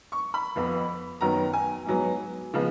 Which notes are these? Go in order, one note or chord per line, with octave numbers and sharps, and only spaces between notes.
C#6
B5
F2 F3 B3
F#2 D#3 F#3 B3 A#5
G#5
G#2 F#3 B3
C#3 F3 G#3 B3